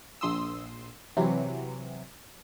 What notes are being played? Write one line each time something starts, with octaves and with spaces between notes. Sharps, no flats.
A#1 C6 D#6 E6
C3 E3 F#3